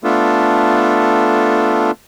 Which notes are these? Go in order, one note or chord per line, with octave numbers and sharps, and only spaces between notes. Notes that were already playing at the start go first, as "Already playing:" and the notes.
A3 B3 D4 F4 A4